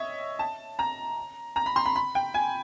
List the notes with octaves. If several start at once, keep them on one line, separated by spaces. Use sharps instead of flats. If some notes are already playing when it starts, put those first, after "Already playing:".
Already playing: C#5 D#5 E5
A5
A#5
A#5
B5
C6
B5
B5
G5
G#5